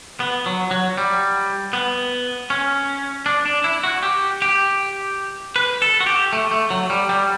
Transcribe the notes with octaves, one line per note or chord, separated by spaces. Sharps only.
B3
F#3
F#3
G3
B3
C#4
D4
D4
E4
F#4
G4
G4
B4
A4
F#4
G4
A3
A3
F#3
G3
G3